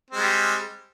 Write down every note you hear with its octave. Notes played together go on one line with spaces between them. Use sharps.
G3 G#3 C4